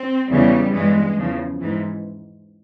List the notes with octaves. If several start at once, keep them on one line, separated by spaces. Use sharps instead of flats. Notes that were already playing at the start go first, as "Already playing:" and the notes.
Already playing: C4
E2 C#3 E3 G3
G2 E3 G#3
E2 C#3 F3
G#2 E3